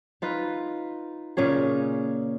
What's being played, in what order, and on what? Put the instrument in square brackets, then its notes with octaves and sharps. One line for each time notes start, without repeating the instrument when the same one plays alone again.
[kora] D#4 F4 B4
A#2 C#3 C#4 G#4